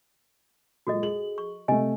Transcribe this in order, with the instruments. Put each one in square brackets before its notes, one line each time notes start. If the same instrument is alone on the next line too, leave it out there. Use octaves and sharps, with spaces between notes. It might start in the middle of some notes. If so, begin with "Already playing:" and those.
[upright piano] A#2 F#3 G#3 [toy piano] F#4 A4 D#5
[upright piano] G#4 F#7
[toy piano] C#6
[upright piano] C3 A3 [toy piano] G4 D#5 G#5